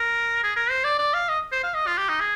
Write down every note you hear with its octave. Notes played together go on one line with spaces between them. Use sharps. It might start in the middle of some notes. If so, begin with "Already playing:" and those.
Already playing: A#4
G#4
A#4
C5
D5
D5
F5
D#5
C5
F5
D#5
F4
G4
D#4
G#4